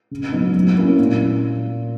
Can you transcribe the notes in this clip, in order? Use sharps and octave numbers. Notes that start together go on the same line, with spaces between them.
C#3
F#3 B3 D#4
F#3
A#3 C#4 E4
A#2